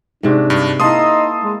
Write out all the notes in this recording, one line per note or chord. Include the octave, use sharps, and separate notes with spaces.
G#2 C3 D4 F#4
G2 D4
A#3 D#4 E4 A5 C6 D#6
G#3